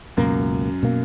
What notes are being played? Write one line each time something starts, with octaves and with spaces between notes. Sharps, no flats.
C#2 F#2 B2 A#3
B2 A#3